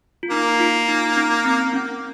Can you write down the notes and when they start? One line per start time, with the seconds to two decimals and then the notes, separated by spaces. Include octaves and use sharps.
0.23 F4
0.31 A#3 D#4
0.60 F4
0.88 D#4
1.16 C#4
1.45 C4
1.73 C#4